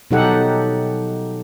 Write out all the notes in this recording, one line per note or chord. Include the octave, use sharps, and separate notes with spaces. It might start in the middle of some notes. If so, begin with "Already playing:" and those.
B2 F#3 D#4 G4 A4 F#5